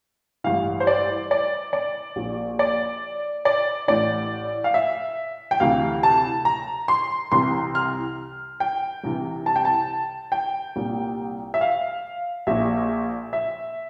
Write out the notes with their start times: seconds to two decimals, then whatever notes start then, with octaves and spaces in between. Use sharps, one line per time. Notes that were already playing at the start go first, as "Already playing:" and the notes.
0.44 A1 G2 E3 F5
0.80 C5
0.87 D5
1.31 D5
1.73 D5
2.16 A#1 A#2
2.59 D5
3.45 D5
3.88 A1 A2 E3 D5
4.64 F5
4.74 E5
5.51 G5
5.60 D2 C3 E3 F5
6.03 A5
6.45 A#5
6.88 C6
7.32 C2 C3 E3 C6
7.75 F6
8.60 G5
9.04 C2 C3 E3
9.46 A5
9.56 G5
9.65 A5
10.32 G5
10.76 C2 A#2
11.54 E5
11.61 F5
12.47 A#1 A#2 E5
13.33 E5